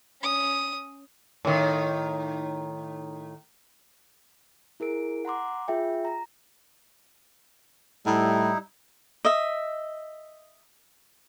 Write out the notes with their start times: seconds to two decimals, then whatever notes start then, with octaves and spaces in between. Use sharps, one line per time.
0.21 C#4 D#6
1.45 A2 D#3
4.80 E4 G#4 A#4 D7
5.25 F#5 A#5 C6 D6
5.68 F4 G#4 E5 G5
6.05 A#5
8.06 A2 G3 D#4 E4
9.25 D#5 E5